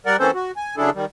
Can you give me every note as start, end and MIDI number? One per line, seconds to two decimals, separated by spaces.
0.06 0.17 55
0.06 0.17 70
0.06 0.17 74
0.06 0.17 78
0.19 0.31 52
0.19 0.31 58
0.19 0.31 60
0.19 0.31 61
0.19 0.31 69
0.19 0.31 72
0.35 0.52 66
0.57 0.76 80
0.77 0.90 49
0.77 0.90 54
0.77 0.90 62
0.77 0.90 64
0.77 0.90 68
0.77 0.90 69
0.94 1.05 51
0.94 1.05 55